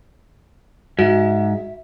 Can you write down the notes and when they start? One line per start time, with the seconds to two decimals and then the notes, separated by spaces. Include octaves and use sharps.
0.99 G#2 F#4 E5